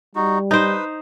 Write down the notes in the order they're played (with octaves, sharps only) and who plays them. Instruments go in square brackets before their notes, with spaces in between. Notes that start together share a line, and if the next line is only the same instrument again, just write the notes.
[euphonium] G3 [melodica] D#4 F#4
[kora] D#4 C5 [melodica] B4